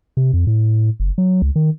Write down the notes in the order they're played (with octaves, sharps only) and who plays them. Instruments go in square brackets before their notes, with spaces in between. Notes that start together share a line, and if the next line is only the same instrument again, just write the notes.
[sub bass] C3
F2
A2
F#1
F#3
C#2
D#3